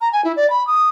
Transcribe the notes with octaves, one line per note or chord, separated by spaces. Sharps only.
A#5
G#5
E4
D5
B5
D#6